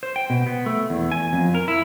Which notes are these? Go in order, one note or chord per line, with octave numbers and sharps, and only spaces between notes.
C5
G5
B2
B3
A3
E2
G#5
F2
A#4
E4